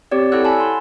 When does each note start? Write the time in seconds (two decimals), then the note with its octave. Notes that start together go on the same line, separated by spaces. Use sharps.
0.11 C4 G4 C#5 D5
0.32 E4 A4 C#5 F#5 E6 F#6
0.44 G#5 A5 B5
0.60 C6